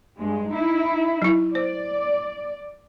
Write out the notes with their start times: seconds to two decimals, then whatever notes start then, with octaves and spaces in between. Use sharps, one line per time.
0.20 G2 G#3
0.52 D#4 E4
1.22 F#3 E4
1.55 C5 D5